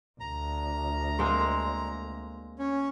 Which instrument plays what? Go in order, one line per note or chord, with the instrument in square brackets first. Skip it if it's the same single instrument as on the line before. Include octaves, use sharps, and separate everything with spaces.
[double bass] D2 [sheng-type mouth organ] A#5
[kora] G#3 A#3 C4
[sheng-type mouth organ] C#4